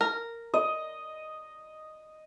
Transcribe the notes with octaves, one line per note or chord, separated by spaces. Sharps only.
A#4
D#5